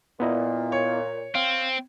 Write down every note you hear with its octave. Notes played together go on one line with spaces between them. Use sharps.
A#2 B3 E4 D#5
C#5
C4 F5